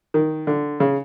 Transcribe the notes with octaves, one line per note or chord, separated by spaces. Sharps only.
D#3
D3
C#3